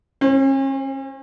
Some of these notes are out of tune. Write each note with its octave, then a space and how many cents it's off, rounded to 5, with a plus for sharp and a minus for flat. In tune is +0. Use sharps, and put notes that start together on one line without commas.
C#4 -40 C5 +20